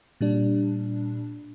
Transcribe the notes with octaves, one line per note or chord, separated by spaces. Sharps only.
A#2 G3 D4